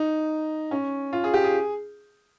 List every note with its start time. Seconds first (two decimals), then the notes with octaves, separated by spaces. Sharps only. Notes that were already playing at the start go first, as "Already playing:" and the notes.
Already playing: D#4
0.71 C#4
1.13 F4
1.24 G#4
1.34 G4
1.44 G#4